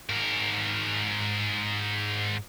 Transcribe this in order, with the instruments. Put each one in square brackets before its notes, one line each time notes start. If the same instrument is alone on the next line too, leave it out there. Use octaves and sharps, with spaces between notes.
[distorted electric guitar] G#2 A#4